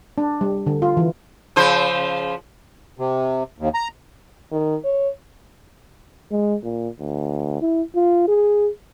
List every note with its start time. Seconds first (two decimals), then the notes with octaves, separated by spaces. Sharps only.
0.18 D4
0.41 G3
0.66 D3
0.82 F4
0.97 E3
1.56 C#3 F3 C5
2.99 C3
3.58 D#2
3.74 A#5
4.51 D#3
4.84 C#5
6.31 G#3
6.64 A#2
7.00 D2
7.62 E4
7.96 F4
8.28 G#4